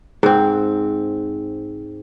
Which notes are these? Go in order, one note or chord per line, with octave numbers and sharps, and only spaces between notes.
G#2 C4